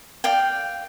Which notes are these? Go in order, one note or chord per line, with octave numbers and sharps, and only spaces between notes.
D5 F5 G5